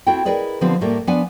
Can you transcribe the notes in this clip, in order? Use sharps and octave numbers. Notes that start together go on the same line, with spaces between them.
C4 E4 F#4 A4 G5
E4 G#4 A#4 B4 D5 D#5
D3 F3 B3 C4 G4 B4
A2 G3 A3 A#3
F3 B3 D4 F#5 G#5